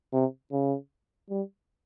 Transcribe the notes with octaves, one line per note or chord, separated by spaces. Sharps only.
C3
C#3
G3